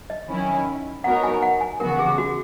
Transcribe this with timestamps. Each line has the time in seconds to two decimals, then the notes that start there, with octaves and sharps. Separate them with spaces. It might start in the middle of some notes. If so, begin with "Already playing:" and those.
0.10 D#5
0.28 D#3 F#3 C#4 E4
1.04 B3 D#4 F#4 A#4 C#5 F#5
1.23 G#5
1.42 F#5
1.61 G#5
1.80 C#3 E3 B3 F#4 A#4
1.99 G#4
2.18 F#4